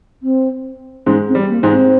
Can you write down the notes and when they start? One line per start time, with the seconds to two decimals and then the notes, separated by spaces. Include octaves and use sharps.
0.23 C4
1.06 G#2 G#3 C#4
1.28 C4
1.35 G3
1.49 A#3
1.63 G#2 G#3
1.71 C4